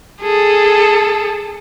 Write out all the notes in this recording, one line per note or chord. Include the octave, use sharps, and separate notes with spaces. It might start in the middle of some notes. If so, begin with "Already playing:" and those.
G#4 A4